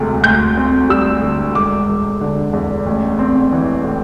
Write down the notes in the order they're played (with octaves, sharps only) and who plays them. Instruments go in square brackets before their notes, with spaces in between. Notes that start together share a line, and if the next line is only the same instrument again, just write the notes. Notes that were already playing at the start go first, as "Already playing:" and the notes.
Already playing: [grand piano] E1 D2 C3 A3
D2 G6
C4
G3 E6
D3
E1 D6
E1
D3
E2
A1
C4
E3
A2